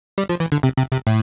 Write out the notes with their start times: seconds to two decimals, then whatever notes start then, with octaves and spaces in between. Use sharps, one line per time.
0.18 G3
0.29 F3
0.40 E3
0.52 D3
0.63 C3
0.78 C3
0.92 C3
1.07 A2